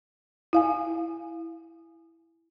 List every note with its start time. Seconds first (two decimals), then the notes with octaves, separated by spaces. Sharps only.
0.53 E4 F5 G#5